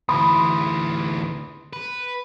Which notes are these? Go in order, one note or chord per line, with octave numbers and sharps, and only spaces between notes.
D2 E3 B5 C6 D#6
B4